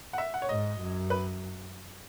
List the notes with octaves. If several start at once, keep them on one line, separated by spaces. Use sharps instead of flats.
F#5
E5
F#5
C#5
G#2 D#5
F#2
B4